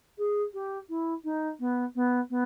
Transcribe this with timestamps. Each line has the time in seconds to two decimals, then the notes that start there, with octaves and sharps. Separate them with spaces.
0.18 G#4
0.54 G4
0.89 E4
1.24 D#4
1.60 B3
1.96 B3
2.30 B3